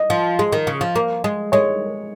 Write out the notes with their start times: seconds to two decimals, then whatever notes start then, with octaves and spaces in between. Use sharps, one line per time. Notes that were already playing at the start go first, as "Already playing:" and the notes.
Already playing: D#5
0.10 F3
0.39 G#3
0.52 D#3
0.67 C#3
0.81 F3
0.96 A#3
1.24 G#3
1.52 G#3 C#5